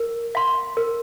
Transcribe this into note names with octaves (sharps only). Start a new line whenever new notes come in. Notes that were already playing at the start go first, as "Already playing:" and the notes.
Already playing: A#4
F5 C6
A#4